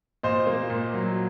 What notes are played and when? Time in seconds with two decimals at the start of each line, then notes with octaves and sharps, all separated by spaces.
0.23 A#2 C5 D#5
0.47 A#3
0.70 A#2
0.94 F#3